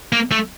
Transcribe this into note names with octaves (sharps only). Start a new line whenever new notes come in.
A#3
A3